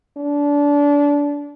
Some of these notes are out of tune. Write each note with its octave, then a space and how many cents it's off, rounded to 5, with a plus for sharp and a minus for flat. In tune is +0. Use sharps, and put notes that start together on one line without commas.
D4 -25